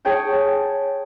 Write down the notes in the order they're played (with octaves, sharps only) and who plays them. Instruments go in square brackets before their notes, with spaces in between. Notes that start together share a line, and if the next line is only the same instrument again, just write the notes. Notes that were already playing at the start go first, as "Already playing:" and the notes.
[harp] G#4 C#5 G5 A5